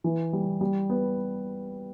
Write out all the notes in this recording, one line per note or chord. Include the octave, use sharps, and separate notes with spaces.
E3
G3
G3
B3